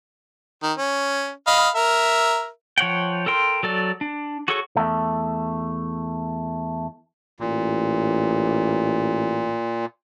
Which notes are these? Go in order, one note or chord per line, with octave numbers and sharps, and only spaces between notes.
D#3
C#4
D#5 F5 B5
A#4 E5
F3 C#5 F#5 G5
A4 A#4 G5 C6
F#3 A4 D5
D4
F#4 G#4 A4 C#5 C#6
E2 A3
A1 A#2